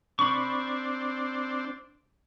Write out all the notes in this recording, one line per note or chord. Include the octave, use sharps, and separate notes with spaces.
C4 D4 B5 C#6